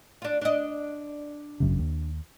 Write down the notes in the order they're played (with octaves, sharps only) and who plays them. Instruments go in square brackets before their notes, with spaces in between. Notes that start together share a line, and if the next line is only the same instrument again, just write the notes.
[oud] D4 F4
D4 D#5
[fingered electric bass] G#1 F#2 C#3
D#2